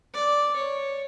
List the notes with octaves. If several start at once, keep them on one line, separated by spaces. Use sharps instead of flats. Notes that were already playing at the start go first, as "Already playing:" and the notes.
D5
C#5